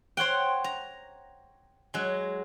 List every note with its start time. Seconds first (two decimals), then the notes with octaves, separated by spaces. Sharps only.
0.17 C5 C#5 F#5 G5
0.64 A#5
1.94 F#3 G#3